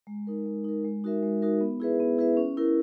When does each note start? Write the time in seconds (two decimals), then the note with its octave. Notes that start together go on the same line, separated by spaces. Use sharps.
0.07 G#3
0.27 D#4 A#4
0.46 G#3
0.64 D#4 A#4
0.85 G#3
1.04 D#4 F#4 A#4 E5
1.23 G#3
1.41 D#4 F#4 A#4 E5
1.61 B3
1.80 E4 G#4 B4 E5
2.00 B3
2.18 E4 G#4 B4 E5
2.37 C#4
2.57 E4 A#4